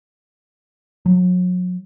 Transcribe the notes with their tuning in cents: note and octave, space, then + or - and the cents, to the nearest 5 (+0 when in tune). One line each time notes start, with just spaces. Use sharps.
F#3 -35